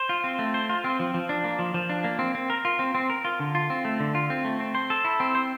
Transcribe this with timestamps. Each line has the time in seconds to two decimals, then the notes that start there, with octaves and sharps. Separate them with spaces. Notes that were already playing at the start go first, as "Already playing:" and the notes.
Already playing: C5
0.09 F4
0.24 C4
0.39 A3
0.54 C5
0.69 F4
0.84 C4
0.99 F3
1.14 F3
1.29 D4
1.44 A#3
1.59 F3
1.74 F3
1.89 D4
2.04 A#3
2.19 C4
2.35 C4
2.50 A#4
2.65 F4
2.79 C4
2.95 C4
3.10 A#4
3.25 F4
3.40 D3
3.55 F4
3.70 C4
3.85 A3
4.00 D3
4.15 F4
4.30 C4
4.45 A3
4.60 C4
4.75 C5
4.90 A4
5.05 E4
5.20 C4
5.35 C5